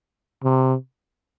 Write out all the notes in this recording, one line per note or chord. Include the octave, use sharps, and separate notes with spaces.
C3